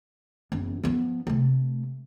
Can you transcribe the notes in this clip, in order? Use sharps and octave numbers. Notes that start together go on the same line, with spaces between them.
F#1 E2
F3 B3
C3 A3